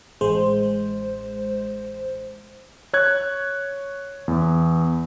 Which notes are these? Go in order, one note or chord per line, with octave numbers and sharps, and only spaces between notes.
A1 G#3 C5
C#5 F#6 G#6
E2